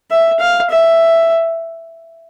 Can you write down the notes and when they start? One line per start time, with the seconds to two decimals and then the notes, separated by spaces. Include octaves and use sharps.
0.11 E5
0.40 F5
0.70 E5